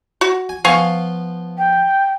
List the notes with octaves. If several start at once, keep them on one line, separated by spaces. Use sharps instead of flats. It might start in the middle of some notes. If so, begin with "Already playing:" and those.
F#4
G#5
F3 B3 F4 F5 G#5 C#6
G5